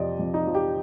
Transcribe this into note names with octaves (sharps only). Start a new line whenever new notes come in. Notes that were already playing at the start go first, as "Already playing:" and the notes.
Already playing: F2 C3 F3 D5 D#5
F2
D#4
F3
G4